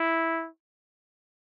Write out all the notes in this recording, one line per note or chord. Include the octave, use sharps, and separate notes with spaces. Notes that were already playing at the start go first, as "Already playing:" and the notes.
Already playing: E4